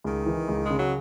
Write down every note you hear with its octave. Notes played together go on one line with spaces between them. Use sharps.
C#2 D#3
E3
C#2
G#3
C#3
F#3